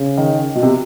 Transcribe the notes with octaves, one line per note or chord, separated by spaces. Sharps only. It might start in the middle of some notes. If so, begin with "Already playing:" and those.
Already playing: C#3
D#3
B2
C3